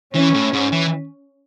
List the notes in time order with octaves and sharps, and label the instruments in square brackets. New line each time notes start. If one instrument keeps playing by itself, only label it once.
[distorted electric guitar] E3 [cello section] C#4
[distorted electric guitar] A2
G#2
E3